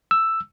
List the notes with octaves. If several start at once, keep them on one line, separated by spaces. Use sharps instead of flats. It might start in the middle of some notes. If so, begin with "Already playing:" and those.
E6